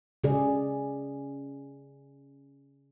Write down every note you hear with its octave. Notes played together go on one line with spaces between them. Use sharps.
C#3 G#4 D5